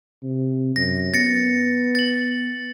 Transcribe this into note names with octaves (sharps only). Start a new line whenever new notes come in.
C3
F#2 A#6
B3 A6 A#6 C#7
A6 F#7